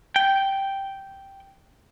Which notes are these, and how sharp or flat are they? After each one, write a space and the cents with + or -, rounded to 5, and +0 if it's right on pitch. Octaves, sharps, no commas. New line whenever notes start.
G5 -5